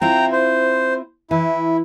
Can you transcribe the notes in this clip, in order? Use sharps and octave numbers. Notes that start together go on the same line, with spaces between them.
C4 E4 F4 G5 A#5
C5
E3 E4